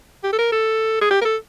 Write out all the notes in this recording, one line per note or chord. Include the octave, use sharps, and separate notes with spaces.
G4
A4
A#4
A4
G#4
G4
A#4
A4